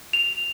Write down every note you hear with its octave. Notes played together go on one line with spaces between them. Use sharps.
F7